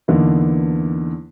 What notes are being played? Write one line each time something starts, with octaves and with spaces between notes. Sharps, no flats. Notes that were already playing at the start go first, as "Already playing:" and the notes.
E2 D3 E3 A#3 D4 D#4